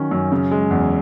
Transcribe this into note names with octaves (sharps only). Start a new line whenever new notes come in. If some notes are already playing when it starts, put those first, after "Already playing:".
Already playing: D#3 F#3 C#4
F#2
C#3
G#3
E2